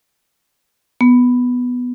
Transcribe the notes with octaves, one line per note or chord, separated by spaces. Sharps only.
B3